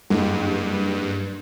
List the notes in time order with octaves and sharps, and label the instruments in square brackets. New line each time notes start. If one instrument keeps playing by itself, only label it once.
[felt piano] F#1 [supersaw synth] G2